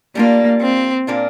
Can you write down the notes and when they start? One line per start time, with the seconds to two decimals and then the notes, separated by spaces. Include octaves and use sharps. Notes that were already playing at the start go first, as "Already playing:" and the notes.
0.15 G3 A#3 D4 F4
0.61 C4
1.07 A#2 A#3 D4 F4